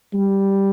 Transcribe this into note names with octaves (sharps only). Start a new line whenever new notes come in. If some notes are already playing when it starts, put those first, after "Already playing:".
G3